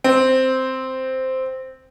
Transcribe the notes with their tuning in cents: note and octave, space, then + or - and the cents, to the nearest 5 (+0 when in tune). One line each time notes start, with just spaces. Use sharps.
C4 -5